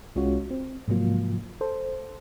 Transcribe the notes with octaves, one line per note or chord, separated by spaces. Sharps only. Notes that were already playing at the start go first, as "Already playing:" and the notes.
C2 G#3 C#4 F4 F#4 C#5
C4
G#2 C3 F3 F#3 A#3 F4
A4 C5